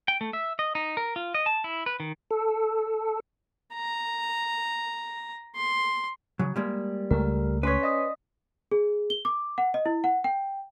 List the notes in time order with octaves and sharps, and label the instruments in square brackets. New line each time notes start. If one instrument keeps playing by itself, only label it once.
[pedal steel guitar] G5
A3
E5
D#5
D#4
A#4
F4
D#5
A5
E4
B4
D#3
[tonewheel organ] A4
[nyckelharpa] A#5
C6
[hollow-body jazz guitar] C#3 F#3
G3 G#3 A#3
[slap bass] C#2 A3 [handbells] A#4
[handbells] C#4 C6 B6 [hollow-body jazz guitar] B4 C#5
[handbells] D5 D#5 D#6
[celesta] G#4
G7
D6
F#5
D#5
E4
F#5
G5